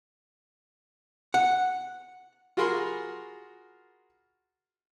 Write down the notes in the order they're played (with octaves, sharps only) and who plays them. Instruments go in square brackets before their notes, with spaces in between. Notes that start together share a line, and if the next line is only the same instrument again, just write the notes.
[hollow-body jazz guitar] F#5
[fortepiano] F4 F#4 G#4 A#4 B5 C6